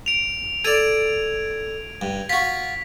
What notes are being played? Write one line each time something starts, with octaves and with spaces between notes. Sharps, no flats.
D7 F7
A4 D5 G#6 D#7 F7
G2
F4 F#4 B6